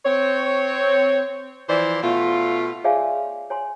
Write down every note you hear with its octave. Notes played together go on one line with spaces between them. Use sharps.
C4 C#5
E3 F3 C5 D5
B2 A3 F4
G#4 C#5 D5 E5 F5 G#5
C#5 G#5 C6